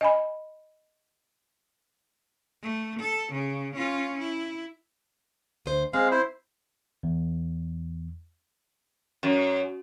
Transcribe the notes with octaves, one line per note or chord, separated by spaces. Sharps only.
D#5 G#5 B5
A3
A4
C#3
C#4 F4
E4
D2 C5
G#3 C4 F5
E4 C5
E2
F#2